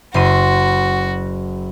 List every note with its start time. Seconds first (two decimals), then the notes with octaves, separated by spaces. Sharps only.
0.14 F#1 F#4 C6 D#7